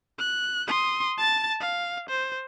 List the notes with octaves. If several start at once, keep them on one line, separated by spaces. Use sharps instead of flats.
F#6
C6 D#6
A5 A6
F5
C5